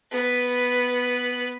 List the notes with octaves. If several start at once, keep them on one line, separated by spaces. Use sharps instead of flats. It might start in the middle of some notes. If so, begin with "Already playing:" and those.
B3 B4